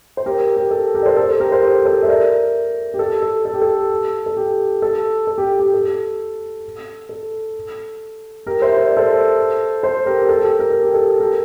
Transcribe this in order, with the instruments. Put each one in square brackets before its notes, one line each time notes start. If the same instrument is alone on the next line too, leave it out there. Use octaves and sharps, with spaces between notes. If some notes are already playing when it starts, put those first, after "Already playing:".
[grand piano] C5
G4 A#4
G4
A4
G4 A#4
D5
A4 C5
A4 C5
A4
G4 A#4
A4 C5
G4 A#4
A4 C5
E5
A#4 D5
G4
A4
A4
A4
G4
A4
A4
G4
A4
A4
G4
G4
A4
A4
G4 A#4
C5 E5
C5
D5
A4 C5
A4 C5
G4 A#4
G4
A4
G4
A4
A#4
A4
G4
A4
G4 A#4